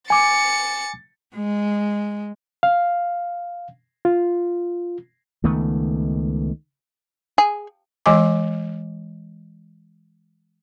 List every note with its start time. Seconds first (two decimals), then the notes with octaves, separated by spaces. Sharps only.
0.10 G#5 D6 A6 C#7
1.36 G#3
2.63 F5
4.05 F4
5.43 C#2 D#3 A3 B3
7.38 G#4
8.06 E3 G#3 D#5 G#5 D6